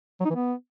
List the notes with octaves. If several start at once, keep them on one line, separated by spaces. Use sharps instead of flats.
F#3
D#4
E3
B3